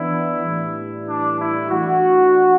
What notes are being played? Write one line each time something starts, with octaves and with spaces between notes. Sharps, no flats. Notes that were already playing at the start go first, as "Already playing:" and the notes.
Already playing: E3 B3 D4 E4
A2 E3 G3 D4
D4
E4
E3 A3 D4 F#4